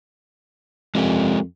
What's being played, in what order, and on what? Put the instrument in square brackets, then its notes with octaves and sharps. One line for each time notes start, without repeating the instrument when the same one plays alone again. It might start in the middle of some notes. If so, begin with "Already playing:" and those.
[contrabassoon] F2 [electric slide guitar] G#3 G4 A#4